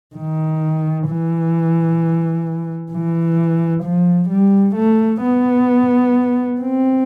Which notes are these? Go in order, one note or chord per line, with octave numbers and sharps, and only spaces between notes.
D#3
E3
E3
F3
G3
A3
B3
C4